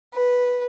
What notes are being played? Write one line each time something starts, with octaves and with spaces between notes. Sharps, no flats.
B4